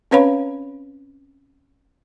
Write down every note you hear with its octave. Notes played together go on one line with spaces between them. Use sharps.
C4 C#4 B4 C#5 F5 B5